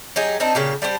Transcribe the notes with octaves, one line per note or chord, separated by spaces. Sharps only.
F#3 D#4 G4 G#4
C4 D4 D#4
A#2 C#3 G4
G3 D4 G4 C5